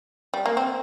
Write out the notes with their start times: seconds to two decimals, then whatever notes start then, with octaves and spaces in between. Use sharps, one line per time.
0.34 G3
0.46 A#3
0.57 C4